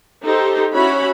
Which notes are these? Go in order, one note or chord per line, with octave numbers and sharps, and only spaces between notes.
D#4 G4 A4 C5
C#4 E4 F#4 C#5 B5